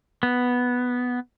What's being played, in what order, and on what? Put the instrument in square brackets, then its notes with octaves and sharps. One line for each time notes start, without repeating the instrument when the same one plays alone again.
[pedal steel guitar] B3